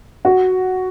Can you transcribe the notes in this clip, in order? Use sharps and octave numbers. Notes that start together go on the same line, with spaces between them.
F#4